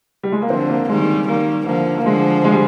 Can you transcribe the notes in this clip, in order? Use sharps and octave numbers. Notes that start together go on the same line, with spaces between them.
G3
G#3
A#3
D3 F3 C4
A#3
D#3 G3 G#3
D#3 G3 A#3
D3 F3 A#3
A#3
D3 F3 G#3
G#3
G3